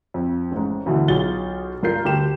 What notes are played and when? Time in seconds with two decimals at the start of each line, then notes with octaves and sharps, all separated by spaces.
0.14 F2
0.51 A1 G#2
0.86 D2 B2 E3
1.08 B1 F4 G#4 A6 G7
1.83 G2 F4 A#4 G6 C7
2.04 D2 G4 E7